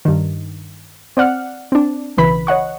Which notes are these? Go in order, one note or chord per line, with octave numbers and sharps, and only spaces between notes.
G2 D#3
C4 D5 F#5 F6
C4 D4
B1 C#3 E3 B4 B5 B6
C#5 D#5 F#5 C#6